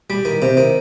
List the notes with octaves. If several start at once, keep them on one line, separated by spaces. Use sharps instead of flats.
G3
D#3
C3
D#3